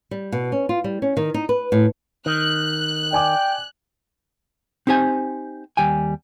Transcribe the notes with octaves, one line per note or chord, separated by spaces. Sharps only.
G3
B2
C#4
F4
G3
C#4
D#3
D#4
B4
A2
D#3 F#6
D5 G5 G#5 D6
C4 D#4 G4 C5 G#5
D#2 G3 G5 G#5